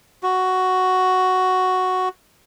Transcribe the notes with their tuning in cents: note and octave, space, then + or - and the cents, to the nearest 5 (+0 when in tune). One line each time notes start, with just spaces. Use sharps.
F#4 +5